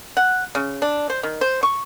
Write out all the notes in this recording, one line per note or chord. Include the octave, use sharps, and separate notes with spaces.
F#5
C#3
D4
C5
D#3
C5
C#6